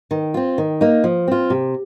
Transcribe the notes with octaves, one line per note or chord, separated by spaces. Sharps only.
D#3
C4 F4
D#3
A#3 D#4
F3
C4 F4
C3